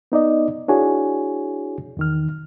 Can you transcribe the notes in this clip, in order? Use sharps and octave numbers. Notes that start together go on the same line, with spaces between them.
B3 D#4 D5 D#5
D4 E4 F#4 G#4 C#5 G#5
E2 D#3 F6